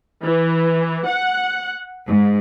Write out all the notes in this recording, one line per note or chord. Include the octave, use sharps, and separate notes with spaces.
E3
F#5
G#2